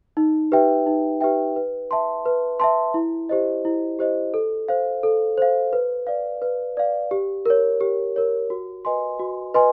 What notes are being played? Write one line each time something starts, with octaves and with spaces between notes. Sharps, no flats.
D#4
G4 B4 E5 G5
D#4
G4 B4 E5 G5
B4
E5 A5 C6
B4
E5 A5 C6
E4
G4 C5 D#5
E4
G4 C5 D#5
A4
C5 F5
A4
C5 F5
B4
D5 F5
B4
D5 F5
G4
A#4 C#5
G4
A#4 C#5
F#4
B4 D#5 G#5 C6
F#4
B4 D#5 G#5 C6